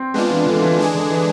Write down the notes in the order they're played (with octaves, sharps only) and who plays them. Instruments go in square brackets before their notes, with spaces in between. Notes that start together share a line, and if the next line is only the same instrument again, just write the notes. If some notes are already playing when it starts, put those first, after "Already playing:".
Already playing: [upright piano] C4
[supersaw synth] G#3 D4 F4 [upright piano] B3
[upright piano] E3
D3
E3
[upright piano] E3 [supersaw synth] G#3 D4 G#4
[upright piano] D3
E3